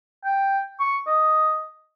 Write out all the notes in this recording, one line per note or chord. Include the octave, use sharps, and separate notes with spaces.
G5
C#6
D#5